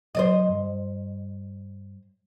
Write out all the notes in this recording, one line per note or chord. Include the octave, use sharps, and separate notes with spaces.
E1 D3 F#3 C5 D5 D#5
G2